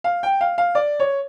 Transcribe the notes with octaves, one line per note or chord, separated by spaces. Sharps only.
F5
G5
F5
F5
D5
C#5